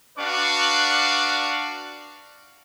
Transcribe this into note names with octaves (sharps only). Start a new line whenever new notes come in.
D4 F#4 B4 D5 F5 C#6